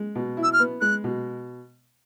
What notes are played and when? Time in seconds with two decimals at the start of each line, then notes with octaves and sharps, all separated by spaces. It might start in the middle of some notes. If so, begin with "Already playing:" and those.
Already playing: G#3
0.15 B2
0.37 E4
0.43 E6
0.53 F6
0.59 B3
0.81 G#3 F#6
1.04 B2